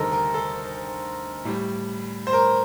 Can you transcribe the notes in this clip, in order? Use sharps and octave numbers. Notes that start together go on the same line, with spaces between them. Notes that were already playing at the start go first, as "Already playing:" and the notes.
Already playing: D2 C3 D#3 G3 A4 A#4 C5 D#5
A#4
A4
A2 G3
C5
A#4